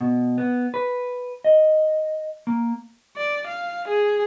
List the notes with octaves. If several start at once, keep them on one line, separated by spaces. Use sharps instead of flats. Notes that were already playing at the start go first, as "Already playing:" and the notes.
B2
B3
B4
D#5
A#3
D5
F5
G#4